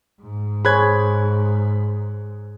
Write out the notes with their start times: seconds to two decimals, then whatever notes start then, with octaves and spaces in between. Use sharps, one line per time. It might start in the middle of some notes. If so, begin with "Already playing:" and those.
0.21 G#2
0.65 G#4 C5 C#5 B5 F#6 G#6